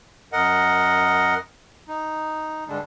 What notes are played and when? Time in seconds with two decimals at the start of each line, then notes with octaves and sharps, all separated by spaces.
0.33 F#2 A#4 D#5 F#5
1.88 D#4
2.68 G2 D3 G3 G#3 D4